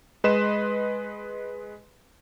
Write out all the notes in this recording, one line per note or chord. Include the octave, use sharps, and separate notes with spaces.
G#3 B4 D#5 C6 E7